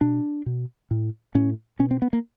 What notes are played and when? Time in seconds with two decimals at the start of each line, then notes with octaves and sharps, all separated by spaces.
0.01 B2 D4
0.46 B2
0.91 A2
1.35 A2 C#4
1.79 B2 C#4
1.91 C4
2.02 B3
2.13 A#3